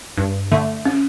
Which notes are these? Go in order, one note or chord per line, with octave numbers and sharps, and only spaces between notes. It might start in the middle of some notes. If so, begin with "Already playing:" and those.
G2
D3 A3
C#4